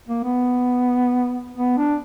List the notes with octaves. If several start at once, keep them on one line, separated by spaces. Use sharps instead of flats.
A#3
B3
B3
D4